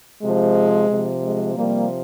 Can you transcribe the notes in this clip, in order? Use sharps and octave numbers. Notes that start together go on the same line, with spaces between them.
C3 F3 G#3
C3 F3
G#3
C3 F3 G3 A#3